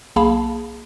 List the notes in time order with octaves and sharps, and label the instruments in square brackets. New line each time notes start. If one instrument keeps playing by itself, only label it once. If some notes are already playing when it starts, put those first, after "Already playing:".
[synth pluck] B1 A#3 G#4 F5 A5 B5